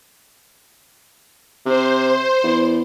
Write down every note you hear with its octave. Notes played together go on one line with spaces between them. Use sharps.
C3 C5
E2